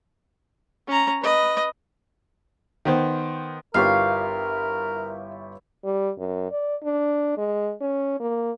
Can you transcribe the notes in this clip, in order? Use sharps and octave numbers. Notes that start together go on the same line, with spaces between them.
C#4 A#5
B4 D#5
D#3 B3 C5
G1 E4 F4 G4 A#4 B4 C#5 F5
G3
F#2
D5
D4
G#3
C#4
A#3